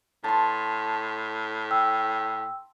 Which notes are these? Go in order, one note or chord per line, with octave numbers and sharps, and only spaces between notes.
A2 A5 C6
G5 E6